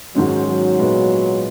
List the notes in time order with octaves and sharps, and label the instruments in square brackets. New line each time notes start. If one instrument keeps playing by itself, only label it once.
[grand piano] G#2 D#3 G#3 C#4 [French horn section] F#3
[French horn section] F#3
[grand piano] A#2 G#3 B3